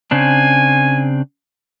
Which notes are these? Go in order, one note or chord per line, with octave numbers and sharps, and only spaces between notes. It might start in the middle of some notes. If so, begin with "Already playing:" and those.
C#3 C4 D4 G#5